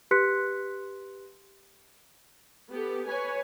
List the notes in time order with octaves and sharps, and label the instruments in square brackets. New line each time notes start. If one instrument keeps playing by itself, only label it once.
[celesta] G4 B4 C6 F#6 B6 C#7
[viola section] B3 G4 A4
B4 C#5 G#5